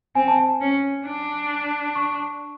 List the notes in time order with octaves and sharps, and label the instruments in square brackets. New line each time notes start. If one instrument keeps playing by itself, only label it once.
[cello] C4 [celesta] G#5
[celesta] A5
G#5
[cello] C#4
D4
[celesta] C#6